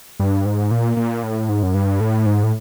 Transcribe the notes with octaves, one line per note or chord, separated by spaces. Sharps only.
G2
G#2
A#2
A#2
A2
G#2
F#2
G2
A2
G#2
A2